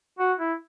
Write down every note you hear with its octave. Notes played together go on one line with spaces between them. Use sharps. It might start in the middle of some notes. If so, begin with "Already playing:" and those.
F#4
E4